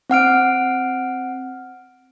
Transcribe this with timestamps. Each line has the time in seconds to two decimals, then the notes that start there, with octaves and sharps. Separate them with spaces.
0.10 C4 F#5 F6 D7